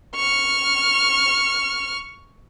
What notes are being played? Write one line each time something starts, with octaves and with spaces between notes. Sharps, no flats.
C#6 F6